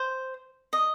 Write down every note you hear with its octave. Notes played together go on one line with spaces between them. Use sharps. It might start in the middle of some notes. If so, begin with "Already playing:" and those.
Already playing: C5
D#5